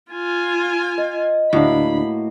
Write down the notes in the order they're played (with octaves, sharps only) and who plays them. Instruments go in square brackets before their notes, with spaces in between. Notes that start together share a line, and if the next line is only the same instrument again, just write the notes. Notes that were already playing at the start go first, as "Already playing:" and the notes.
[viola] F4 G#5
[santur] D#5
[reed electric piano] D2 D4 [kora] A2 A#3 [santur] F#4 [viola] B5